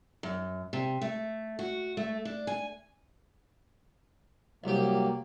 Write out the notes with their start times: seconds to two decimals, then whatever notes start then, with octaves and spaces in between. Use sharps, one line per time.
0.23 F#2
0.73 C3
1.01 A3
1.59 F#4
1.97 A3
2.25 D4
2.47 G#5
4.64 C2 F#3 A#3 G4